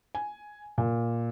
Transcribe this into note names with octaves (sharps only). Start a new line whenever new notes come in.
G#5
A#2